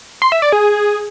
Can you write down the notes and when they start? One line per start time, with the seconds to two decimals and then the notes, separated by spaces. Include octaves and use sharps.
0.22 C6
0.32 E5
0.42 D5
0.52 G#4